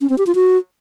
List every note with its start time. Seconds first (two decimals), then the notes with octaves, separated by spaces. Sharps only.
0.01 C#4
0.10 C4
0.18 G4
0.27 F4
0.35 F#4